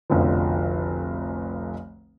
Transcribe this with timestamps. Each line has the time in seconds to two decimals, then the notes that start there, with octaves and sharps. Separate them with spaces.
0.10 F1 B1 D3 F3